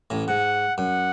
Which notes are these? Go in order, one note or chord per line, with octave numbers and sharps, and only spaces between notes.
A1 A2
G#2 F#5
F#2 F#5